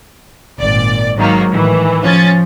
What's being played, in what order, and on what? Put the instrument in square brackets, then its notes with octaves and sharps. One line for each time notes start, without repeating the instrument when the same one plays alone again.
[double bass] G#1 A#2 [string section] D5
[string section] G#2 D#3 A#3 [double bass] F#3
[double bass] A2 D#3 [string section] E3
[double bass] F3 [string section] C#4 A6